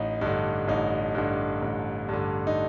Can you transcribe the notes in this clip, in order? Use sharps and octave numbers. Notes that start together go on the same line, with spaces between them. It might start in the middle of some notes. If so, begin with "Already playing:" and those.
Already playing: A1 D#4
G2 D3 D#4
A1 D#4
G2 D3
A1
G2 D3
D#4